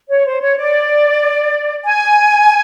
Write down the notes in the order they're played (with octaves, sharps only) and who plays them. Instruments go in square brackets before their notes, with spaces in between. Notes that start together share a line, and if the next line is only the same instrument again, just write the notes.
[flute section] C#5
C5
C#5
D5
G#5